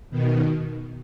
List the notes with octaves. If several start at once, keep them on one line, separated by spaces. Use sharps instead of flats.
B2 D#3